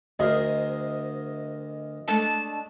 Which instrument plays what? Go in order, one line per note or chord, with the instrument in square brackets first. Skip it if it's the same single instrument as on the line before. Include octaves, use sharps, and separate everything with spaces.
[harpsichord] D2 A#4 [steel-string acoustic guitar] G#4 C5 E5 [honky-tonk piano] D#5
[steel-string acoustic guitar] G#3 A3 D4 [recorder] A5